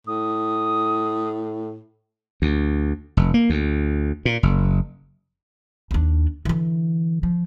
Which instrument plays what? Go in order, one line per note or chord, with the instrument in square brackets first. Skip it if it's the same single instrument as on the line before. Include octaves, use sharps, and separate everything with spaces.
[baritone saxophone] A2 [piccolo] D#6
[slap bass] D2
F1
A#3
D2
A#2
F#1
[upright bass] D#2 D4
D3 E3
F3